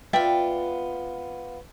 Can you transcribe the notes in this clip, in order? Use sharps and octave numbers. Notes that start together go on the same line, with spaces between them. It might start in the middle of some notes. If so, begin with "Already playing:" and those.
B3 F4 D5 E5 G5